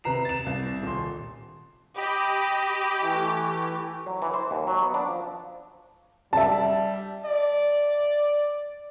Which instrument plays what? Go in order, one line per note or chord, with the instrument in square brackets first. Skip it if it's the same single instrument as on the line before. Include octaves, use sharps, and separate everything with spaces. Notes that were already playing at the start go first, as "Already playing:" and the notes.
[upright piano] C3 B4 A#5 C7 E7
A6 E7
C2
D#1 C6
[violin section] G4 [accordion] D#5 G5 B5
[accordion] E3 A3
[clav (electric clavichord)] F#3
E3
C5
D#2
F#3
B3
D4
F3
[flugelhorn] G3 [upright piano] E5 A5
[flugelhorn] D5